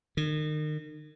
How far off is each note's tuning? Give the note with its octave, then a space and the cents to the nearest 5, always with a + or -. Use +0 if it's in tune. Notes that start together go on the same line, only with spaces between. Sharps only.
D#3 -35